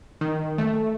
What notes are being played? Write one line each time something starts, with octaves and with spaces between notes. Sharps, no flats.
D#3
A3